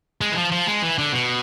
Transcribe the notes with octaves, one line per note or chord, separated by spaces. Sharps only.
G#3
E3
F3
F3
G#3
E3
D3
B2